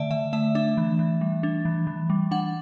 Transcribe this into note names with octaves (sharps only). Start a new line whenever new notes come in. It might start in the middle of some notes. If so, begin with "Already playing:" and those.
Already playing: D3 A3 D5 E5 A5
D3 E5
A3 E5
D4 E5
E3
E3
G3
D4
E3
E3
G3
D4 F#5